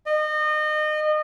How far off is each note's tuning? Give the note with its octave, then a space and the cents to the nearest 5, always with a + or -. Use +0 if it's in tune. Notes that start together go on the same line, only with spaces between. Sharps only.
D#5 -30